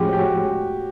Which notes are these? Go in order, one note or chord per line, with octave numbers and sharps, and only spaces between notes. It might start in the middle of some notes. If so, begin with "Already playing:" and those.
Already playing: A2 F3 G#3 C#4 F#4 G4
G4
F#4